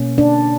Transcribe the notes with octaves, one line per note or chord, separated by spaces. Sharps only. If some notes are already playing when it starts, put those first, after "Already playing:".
Already playing: B2 A#3 C#4
D4